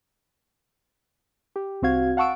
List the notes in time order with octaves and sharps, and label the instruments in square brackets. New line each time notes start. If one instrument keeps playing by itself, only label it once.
[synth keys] G4
C2 C4 F#4 F5 G#6
F5 F#5 A5 C#6 E6 D7